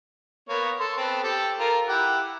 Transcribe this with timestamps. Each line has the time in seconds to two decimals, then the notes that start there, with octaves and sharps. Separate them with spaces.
0.49 A#3 B3 C#5
0.80 A4 C6
0.97 B3 C4 A5
1.23 G4 A4
1.59 F4 A#4
1.89 E4 G4 F#5